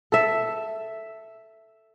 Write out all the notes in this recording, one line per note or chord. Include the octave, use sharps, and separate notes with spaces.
A4 E5